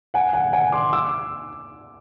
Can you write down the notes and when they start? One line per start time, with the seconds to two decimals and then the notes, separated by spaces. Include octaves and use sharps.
0.14 F#5 G#5
0.33 F#5 G#5
0.53 F#5 G#5
0.72 C6 D6
0.93 D6 E6